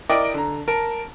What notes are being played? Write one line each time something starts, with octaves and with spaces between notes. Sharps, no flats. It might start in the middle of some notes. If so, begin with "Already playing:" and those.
E4 A#4 D5 D#5 G5 D6
D3 A#5
A#4 A5